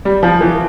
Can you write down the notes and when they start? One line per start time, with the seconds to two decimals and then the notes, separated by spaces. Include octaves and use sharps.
0.05 G3
0.23 F3
0.41 E3